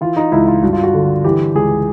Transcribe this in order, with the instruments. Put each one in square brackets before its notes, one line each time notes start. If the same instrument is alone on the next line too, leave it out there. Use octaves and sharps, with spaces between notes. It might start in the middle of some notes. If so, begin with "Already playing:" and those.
[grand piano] E3 F4
D#4
C#2 E4
F4
G2 F#4
F4
F#4
D3
E3 G4
C#2 G#4